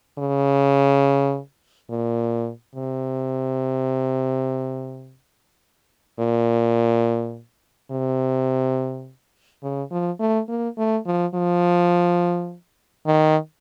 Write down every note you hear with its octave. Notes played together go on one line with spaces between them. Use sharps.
C#3
A#2
C3
A#2
C3
C#3
F3
A3
A#3
A3
F3
F3
D#3